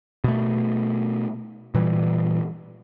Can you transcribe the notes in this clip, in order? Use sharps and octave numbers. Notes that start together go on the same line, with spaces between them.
B2 A3
A#2 E3 G3